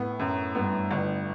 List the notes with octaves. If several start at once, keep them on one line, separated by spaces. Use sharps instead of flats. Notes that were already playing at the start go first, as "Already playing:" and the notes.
Already playing: A2 B3
F#2
G2 B3
G1